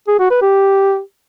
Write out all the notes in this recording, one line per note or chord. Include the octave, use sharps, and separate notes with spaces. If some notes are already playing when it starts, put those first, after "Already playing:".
G#4
F#4
B4
G4